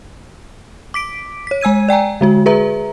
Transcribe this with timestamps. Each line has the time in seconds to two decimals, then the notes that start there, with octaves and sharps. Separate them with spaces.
0.94 D6 B6 D7
1.47 C#5 B6
1.61 G#3 G#5 E6 G#6 D#7
1.89 D5 G5 G#5 A#5
2.21 D3 G#3 F#4
2.46 G#4 B4 E5 A#5